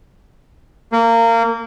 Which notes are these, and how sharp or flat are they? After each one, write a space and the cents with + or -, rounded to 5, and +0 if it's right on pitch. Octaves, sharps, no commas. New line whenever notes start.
A#3 -25